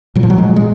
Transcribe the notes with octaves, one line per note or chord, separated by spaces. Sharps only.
A#2 F#3
F3
F#3
A#2 G#3
A#2
G#3